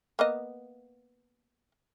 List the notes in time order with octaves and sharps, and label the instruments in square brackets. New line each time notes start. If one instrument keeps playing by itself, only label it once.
[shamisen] A#3 B3 D#5